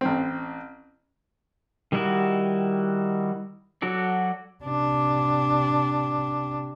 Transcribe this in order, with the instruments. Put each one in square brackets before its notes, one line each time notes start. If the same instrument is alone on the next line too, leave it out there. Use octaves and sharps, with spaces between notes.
[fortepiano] A1 C4
[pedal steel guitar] D#3 G3 D#4 E4 F#4
F#3 F#4 A4 D5
[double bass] C3 D4